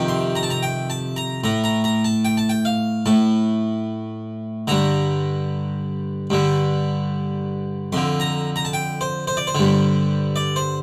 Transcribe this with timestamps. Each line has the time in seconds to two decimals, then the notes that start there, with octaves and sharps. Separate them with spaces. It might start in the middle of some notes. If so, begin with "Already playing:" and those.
Already playing: F2 C3 D#3
0.08 C6
0.35 A#5
0.43 A5
0.50 A#5
0.63 G5
0.90 A5
1.16 A#5
1.44 A2 A#5
1.64 A#5
1.84 A#5
2.04 A5
2.25 G5
2.37 A5
2.49 G5
2.65 F5
3.06 A2 A5
4.68 G2 D3 A#5
6.30 G2 D3
7.93 F2 D3 C6
8.20 A#5
8.56 A#5
8.65 A5
8.73 G5
9.01 C5
9.27 C5
9.37 D5
9.47 C5
9.55 G2 D3
10.36 D5
10.56 C5